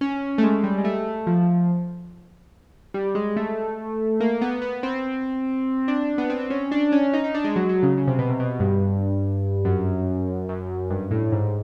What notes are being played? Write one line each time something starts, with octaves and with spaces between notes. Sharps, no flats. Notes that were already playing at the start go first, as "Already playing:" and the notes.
C#4
A3
G#3
G3
G#3
A3
F3
G3
G#3
A3
A#3
B3
B3
C4
D4
B3
C4
C#4
D4
C#4
D#4
D#4
D4
G#3
F#3
F#3
C#3
C#3
C3
B2
C3
B2
G2
F#2
F#2
G2
A2
G#2